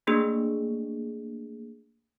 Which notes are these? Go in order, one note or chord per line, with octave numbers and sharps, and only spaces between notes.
A3 A#3 D4 G#4